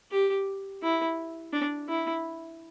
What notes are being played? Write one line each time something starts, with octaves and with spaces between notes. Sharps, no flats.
G4
E4
D4
E4